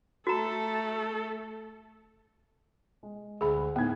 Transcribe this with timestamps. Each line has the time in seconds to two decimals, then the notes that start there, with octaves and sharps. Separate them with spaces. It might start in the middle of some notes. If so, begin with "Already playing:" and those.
0.27 A3 F#4 A4 A#5
3.03 G#3
3.41 D2 G#4 B5
3.76 A2 B3 D#4 G#4 G#6